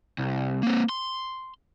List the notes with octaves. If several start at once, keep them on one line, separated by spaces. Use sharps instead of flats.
C2
A#3 C4
C6